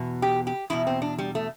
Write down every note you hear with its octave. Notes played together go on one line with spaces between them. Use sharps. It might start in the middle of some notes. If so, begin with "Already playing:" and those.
Already playing: E2 B2
G4
G4
E2 B2 E4
C4
D4
G3
A3